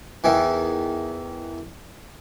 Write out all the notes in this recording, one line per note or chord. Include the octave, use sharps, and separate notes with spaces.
E2 D#3 E3